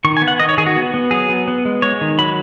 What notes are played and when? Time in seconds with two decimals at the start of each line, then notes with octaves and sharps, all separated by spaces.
0.05 D#3 C#6
0.17 G#5
0.22 B3
0.28 F#5
0.39 D#3 D#5
0.49 C#5
0.58 D#3 G#4
0.66 F#4
0.76 B3
0.94 B3
1.11 F#3 G#4
1.29 B3
1.48 B3
1.65 G#3
1.82 G#3 C#5
2.01 D#3
2.19 F#3 B5